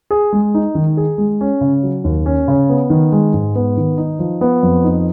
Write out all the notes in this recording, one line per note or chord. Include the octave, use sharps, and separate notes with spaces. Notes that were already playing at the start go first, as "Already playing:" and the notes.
G#4
G#3
D#4
D#3
G#4
G#3
C#4
C#3
F#3
D#2
C#4
C#3
B3
D#3
G#3
G#2
B3
D#3
D#4
F3
B3
F2
D#4